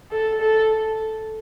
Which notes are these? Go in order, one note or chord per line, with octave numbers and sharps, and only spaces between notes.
A4
A4